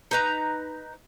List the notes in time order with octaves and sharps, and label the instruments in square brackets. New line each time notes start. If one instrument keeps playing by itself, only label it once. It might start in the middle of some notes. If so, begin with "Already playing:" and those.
[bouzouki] D#4 B4 A#5